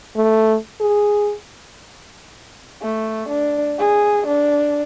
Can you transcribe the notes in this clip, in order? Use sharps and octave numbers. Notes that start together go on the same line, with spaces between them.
A3
G#4
A3
D4
G#4
D4